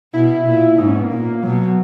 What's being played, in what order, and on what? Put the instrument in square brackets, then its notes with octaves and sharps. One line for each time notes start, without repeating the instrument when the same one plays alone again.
[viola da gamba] B2 [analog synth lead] E4
[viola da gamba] A#2
[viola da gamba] G#2 [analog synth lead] D#4
[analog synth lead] C#4
B3
A#3
[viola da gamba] A#2
[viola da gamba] B2 [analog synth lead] F#3